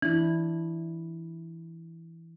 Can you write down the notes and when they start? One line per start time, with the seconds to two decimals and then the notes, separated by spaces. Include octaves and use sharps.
0.02 E3 D4 E4